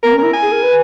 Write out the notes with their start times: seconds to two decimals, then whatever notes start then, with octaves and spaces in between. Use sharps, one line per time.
0.03 B3 A#4
0.13 C#4
0.18 E4 A#4
0.33 G#5
0.42 G#4
0.52 A#4
0.63 B4